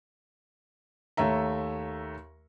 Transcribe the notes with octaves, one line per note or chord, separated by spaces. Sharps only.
D#2 A3 C#5 E5 A#5